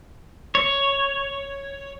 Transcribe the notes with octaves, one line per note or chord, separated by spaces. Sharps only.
C#5